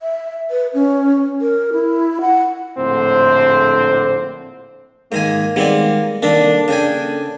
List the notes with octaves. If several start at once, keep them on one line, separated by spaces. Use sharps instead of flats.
E5
B4
C#4
A#4
E4
F#5
A#1 A2 D3 C4 C5
G#2 D#3 A#3 G#5
D#3 G3 G#3 B3 C4 D5
C2 D#3 A#3 D4 A4
C#3 D4 G5 G#5